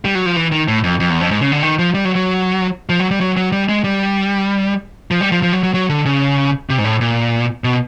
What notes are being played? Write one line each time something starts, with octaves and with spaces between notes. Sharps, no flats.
G3
F#3
F3
E3
D#3
A2
F2
F2
E2
F2
G#2
C#3
D3
D#3
F3
G3
F#3
F#3
F3
F#3
G3
F#3
F#3
G3
G#3
G3
F3
G3
F3
F3
F#3
F#3
F#3
D3
C#3
C3
G#2
A2
A#2
B2